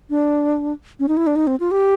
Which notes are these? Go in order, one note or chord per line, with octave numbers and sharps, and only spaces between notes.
D4
C#4
D#4
E4
D4
D#4
C4
F4
G4